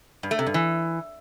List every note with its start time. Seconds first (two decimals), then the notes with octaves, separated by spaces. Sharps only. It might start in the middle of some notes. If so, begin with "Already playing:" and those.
0.23 G2
0.31 A3
0.39 C3
0.46 G2
0.54 E3